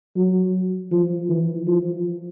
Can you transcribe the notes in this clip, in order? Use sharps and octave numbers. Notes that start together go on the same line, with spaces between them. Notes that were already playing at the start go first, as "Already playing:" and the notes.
F#3
F3
E3
F3